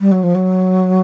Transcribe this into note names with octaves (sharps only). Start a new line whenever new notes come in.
G3
F#3
F3
F#3